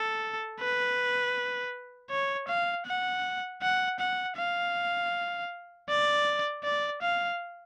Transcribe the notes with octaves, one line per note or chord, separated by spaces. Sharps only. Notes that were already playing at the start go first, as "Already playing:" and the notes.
Already playing: A4
B4
C#5
F5
F#5
F#5
F#5
F5
D5
D5
F5